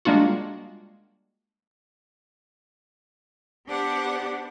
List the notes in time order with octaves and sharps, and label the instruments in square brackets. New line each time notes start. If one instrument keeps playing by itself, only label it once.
[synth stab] G3 G#3 A#3 D4 F4 F#4
[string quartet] B3 D4 G4 C5 F#5